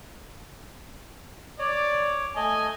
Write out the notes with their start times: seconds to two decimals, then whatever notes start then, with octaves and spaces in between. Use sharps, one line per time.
1.59 C#5 D5
2.36 A3 D#5 G#5